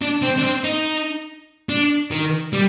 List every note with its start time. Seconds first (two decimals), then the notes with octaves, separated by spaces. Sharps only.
0.01 D4
0.22 C4
0.38 D4
0.43 C4
0.64 D#4
1.69 D4
2.11 D#3
2.53 G3